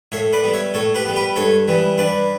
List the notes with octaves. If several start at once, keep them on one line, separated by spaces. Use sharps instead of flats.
A2 C#5 E5
B4 D5
G3 B3
C#5 E5
A2 A4 C#5
G4 B4
G3 B3
G4 B4
G2 A4 C#5
E3 G3 B3
G2 B4 D5